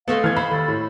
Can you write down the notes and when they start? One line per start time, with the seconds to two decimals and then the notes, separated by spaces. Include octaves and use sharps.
0.08 G#3 A3 B3 A4 F5
0.24 E3 F6 G#6
0.36 C5 B5
0.51 D#2 A4
0.68 A2